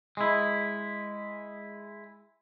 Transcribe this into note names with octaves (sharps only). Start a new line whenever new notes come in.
G#3 E4